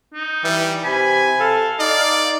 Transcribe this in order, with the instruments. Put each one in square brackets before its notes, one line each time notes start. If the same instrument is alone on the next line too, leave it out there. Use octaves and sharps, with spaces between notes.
[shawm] D#4
[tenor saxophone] E3 [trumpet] G3
[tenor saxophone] C3 [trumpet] G#5 [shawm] B5
[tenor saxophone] A4 [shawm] F5
[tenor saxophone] D#4 [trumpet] D5